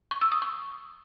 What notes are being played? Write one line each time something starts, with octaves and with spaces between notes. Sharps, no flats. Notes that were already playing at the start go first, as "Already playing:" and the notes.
C#6
E6
D#6
C#6